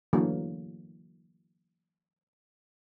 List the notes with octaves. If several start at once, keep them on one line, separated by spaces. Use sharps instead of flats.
D3 E3 F#3 A#3